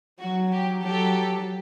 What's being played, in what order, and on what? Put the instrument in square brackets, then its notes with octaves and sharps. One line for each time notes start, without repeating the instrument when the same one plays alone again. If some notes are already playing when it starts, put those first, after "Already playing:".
[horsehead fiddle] F#3 [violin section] F#4
[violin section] G4
[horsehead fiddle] F#3 [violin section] G4 A4